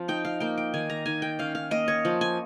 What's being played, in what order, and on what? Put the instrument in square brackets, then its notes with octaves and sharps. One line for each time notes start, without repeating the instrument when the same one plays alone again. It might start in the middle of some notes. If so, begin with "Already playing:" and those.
Already playing: [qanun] F3 C4
D#4 G5
F5
A#3 G5
G5
D#3 G#5
A#5
D#3 G#5
G5
C#4 F5
F5
A#3 D#5
C#5
F3
G#5